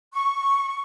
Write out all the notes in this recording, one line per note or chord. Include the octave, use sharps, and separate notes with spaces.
C#6